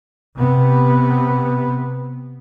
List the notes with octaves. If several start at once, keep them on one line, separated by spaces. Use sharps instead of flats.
C3 B3